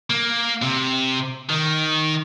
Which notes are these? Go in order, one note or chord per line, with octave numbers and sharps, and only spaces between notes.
A#3
C3
D#3